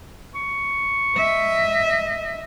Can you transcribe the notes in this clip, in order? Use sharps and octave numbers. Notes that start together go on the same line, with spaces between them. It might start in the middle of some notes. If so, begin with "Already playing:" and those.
C#6
D#5 E5